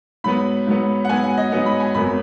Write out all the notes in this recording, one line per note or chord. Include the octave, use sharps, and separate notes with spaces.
G#2 F#3 B3 B5
G#2 F#3 B3
F#5
G#2 F#3 B3 G#5
F#5
D#5
G#2 F#3 B3 D#5
B5
G#5
G#1 F#2 F#3 B3 B5